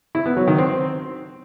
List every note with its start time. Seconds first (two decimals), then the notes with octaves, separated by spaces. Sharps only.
0.15 E4
0.26 B3
0.37 F#3
0.47 D#3
0.58 C4